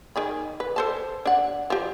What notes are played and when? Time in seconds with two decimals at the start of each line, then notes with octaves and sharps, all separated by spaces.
0.16 D#3 G#4 B5
0.60 B4
0.76 A4 C5 A5
1.25 D4 F#5
1.70 F3 G4